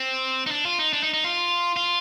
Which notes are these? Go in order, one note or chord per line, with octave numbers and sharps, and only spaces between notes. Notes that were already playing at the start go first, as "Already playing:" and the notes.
Already playing: C4
D#4
D4
F4
D#4
D4
D#4
D#4
F4
F4